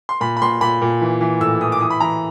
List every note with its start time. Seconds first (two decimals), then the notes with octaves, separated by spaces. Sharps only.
0.09 C6
0.21 A#2 B5
0.37 B5
0.42 A#2 C6
0.61 A#2 B5
0.82 A#2
1.01 E3
1.21 E3
1.40 A2 E6
1.61 E3 D#6
1.72 D6
1.81 E3 D#6
1.90 B5
2.00 E3 A#5